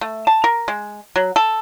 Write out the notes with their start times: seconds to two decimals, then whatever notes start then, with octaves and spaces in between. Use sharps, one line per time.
0.01 A3
0.27 A5
0.44 A#4
0.68 G#3
1.16 F#3
1.36 A4